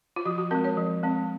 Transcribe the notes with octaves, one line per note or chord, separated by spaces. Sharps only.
F4
F3 F#4
F#4
G#3 C4 A#4
C#5
F3
G#3 C4